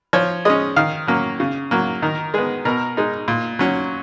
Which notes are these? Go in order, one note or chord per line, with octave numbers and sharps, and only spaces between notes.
F3 C#5
G#3 C#4 D#5
D#3 F5
F#3 A#3 C#4
C#3
F#3 A#3
D#3 A#4
G#3 B3 G#4
B2 A#4
G#3 D#4
A#2
F#3 C#4